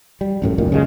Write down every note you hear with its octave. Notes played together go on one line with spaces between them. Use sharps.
G3
A1 F#2 A2
C#2 F#2 A#2 D#3
C#3 G3 G#3